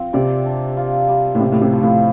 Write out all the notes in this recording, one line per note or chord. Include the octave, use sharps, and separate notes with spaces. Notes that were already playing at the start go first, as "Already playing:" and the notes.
Already playing: F3 C4
C3 D5
D4
F4
G3
A2
C3 F4
A2
C3
F3
A2